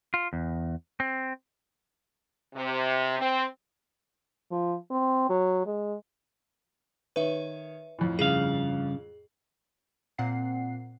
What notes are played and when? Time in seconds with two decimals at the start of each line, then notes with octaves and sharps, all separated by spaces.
0.14 F4
0.33 E2
1.00 C4
2.54 C3
3.19 C4
4.51 F3
4.90 C4
5.30 F#3
5.66 G#3
7.16 D#3 B4 C#5 E5
7.99 F2 A2
8.19 G2 C#3 G#4 F5
10.18 A#2 C4 F#5 C7